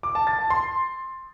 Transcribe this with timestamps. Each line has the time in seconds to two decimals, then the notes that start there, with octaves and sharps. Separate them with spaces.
0.03 D6
0.15 A5
0.27 A6
0.39 A5
0.50 C6